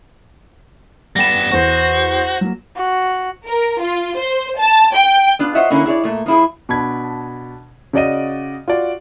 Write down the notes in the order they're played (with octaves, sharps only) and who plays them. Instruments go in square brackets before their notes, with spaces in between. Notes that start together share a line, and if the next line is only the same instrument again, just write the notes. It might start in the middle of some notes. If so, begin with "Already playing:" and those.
[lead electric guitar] G3 B3 [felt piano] F#5 G5 B5 [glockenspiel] A#6 E7
[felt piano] E2 F#5 C#6 [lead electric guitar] F#4 [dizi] C5
[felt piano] F#3 A#3
[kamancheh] F#4
[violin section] A#4
F4
C5
A5
G5
[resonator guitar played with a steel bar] B3 D4 F4
F4 C5 C#5 D#5 E5 F#5
D3 A#3 C#4 E4
E4 G#4 C#5 D5
A#2 A3
F3 E4 G#4
[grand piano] B2 D4 A5 B5 G#6
C#3 F#4 D5 D#5 D#7
F4 F#4 D5